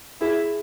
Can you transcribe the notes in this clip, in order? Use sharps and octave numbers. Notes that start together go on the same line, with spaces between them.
E4 G#4